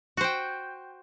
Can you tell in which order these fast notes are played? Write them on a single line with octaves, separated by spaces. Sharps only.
F#4 C5 G5